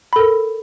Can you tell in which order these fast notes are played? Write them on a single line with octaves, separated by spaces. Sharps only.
B5 A4 A#4